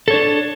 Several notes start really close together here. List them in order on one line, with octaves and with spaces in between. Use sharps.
A4 C#5 D4